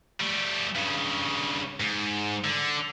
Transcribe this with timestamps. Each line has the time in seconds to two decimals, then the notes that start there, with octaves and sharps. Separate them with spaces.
0.20 G3 A3
0.76 G2 C#3
1.80 G#2
2.44 D3